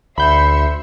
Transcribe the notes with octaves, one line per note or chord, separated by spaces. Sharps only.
D2 E5 B5 C6 G6 C#7